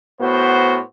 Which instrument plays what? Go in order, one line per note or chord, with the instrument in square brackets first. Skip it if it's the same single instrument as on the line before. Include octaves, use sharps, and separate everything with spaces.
[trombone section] A2 B3 F#4 C5